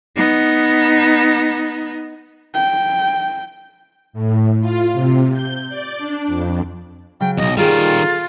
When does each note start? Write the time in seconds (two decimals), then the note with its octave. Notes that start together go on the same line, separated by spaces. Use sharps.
0.17 B3 D#4
2.54 G5
4.13 A2
4.61 F4
4.93 C3
5.33 G6
5.69 D5
5.98 D4
6.27 F2
7.20 C#3 F#3 G5
7.37 B1 E2 D#5
7.57 D#3 G3 F4 G#4 A4